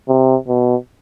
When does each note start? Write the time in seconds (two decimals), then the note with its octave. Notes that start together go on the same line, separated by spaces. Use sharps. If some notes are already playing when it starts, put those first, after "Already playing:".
0.09 C3
0.48 B2